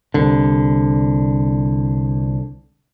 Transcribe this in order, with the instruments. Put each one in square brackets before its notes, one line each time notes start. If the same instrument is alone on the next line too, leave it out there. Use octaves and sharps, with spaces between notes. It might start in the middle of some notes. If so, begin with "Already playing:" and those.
[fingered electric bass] C2 D3